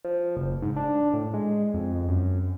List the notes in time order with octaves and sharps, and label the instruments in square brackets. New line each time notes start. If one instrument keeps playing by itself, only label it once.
[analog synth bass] F3
F#1
G#2
D4
A2
G#3
F2
F#2